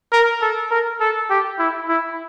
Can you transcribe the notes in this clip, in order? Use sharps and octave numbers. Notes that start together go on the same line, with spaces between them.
A#4
A4
A#4
A4
G4
E4
E4